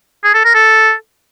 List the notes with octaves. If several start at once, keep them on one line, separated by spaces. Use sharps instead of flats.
G#4
A4
A#4
A4